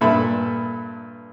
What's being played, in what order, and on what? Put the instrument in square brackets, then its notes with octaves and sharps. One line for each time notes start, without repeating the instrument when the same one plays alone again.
[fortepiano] G2 A#2 A4 E5 B5